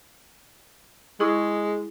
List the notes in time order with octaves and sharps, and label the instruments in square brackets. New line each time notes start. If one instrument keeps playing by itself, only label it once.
[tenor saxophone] G#3 [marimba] E4 G#4 C#6